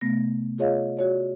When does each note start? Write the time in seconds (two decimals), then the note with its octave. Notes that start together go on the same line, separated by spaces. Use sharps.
0.01 C3 A3 B3 A#6
0.58 F4 G#4 C#5 D#5 F5
0.97 F#4 C#5 D5